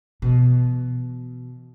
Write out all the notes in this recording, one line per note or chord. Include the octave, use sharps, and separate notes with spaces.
B2 E3